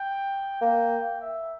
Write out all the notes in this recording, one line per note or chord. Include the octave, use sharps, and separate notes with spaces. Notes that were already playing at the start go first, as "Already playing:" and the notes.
Already playing: G5
A#3 G5
E5